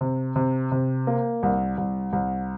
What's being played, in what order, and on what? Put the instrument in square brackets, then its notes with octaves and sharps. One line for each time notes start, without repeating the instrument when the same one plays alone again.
[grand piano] C3
C3
C3
A#3
C2
C2
C2